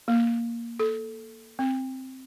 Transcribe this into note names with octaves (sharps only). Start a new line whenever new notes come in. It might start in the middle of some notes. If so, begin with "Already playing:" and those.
A#3
A4
C4